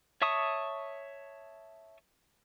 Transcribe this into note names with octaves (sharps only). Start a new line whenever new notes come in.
C#5 E5 A5 C#6 D#6